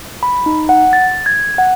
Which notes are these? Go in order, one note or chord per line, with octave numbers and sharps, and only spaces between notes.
B5
D#4
F#5
A6
G#6
F#5